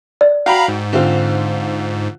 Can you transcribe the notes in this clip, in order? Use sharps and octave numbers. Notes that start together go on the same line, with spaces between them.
D5
F#4 F5 G5 A#5 B5
G#2
D3 C4 F4